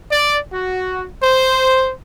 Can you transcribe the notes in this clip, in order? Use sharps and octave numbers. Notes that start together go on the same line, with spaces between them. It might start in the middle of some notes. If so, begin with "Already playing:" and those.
D5
F#4
C5